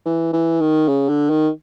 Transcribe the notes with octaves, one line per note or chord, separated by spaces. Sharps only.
E3
E3
D#3
C#3
D3
D#3